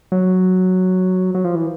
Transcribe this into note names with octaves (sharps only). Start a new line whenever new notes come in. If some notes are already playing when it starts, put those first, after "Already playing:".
F#3
F#3
F3
E3